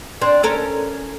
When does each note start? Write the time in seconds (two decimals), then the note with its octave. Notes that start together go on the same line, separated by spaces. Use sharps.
0.21 C4 D4
0.43 C#4 A4 A#4